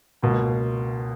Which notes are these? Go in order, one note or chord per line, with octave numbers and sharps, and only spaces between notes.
C#2 B2 A#3